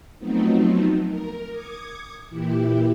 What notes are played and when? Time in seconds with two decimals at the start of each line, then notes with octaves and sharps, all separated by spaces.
0.19 F3 F#3 A3 B3 C4 D#4
1.06 A#4
1.51 D6 D#6 G#6 C#7
2.29 A#2 E3 E4 G4